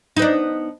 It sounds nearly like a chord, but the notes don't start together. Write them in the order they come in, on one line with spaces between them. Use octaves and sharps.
D#4 B3 D4